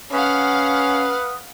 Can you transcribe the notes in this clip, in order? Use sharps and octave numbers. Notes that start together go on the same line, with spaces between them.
C#4 B4 F5 F#5 D#6